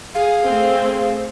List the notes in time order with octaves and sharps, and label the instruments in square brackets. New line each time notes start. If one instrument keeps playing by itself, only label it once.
[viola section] G#4 [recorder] F5
[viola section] A3 C4 G#4